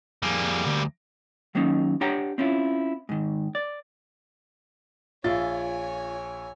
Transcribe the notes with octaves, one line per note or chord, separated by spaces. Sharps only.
F2 G3 A#3 G#4
D2
D#3 F#3 A#3 C#4 D#4
D4 G4 C#5 F#5 G5 A#5
C4 C#4 E4 F4
G#2 D#3
D5
A#1 F4 C#5 E5 G#5 A6